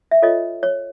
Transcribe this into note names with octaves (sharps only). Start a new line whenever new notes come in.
E5
F4 A4 C#5 D#5
C#5